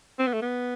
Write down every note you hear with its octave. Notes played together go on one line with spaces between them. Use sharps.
C4
B3
A3
B3